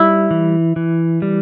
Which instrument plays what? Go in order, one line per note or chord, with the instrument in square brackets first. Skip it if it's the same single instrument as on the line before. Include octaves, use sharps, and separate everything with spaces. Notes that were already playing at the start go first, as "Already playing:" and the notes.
Already playing: [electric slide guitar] G3 [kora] E4
[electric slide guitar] E3
E3
G3